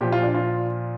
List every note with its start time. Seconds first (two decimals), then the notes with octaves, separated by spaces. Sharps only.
0.01 A#2 F3 G4
0.12 F4
0.23 D4
0.34 F4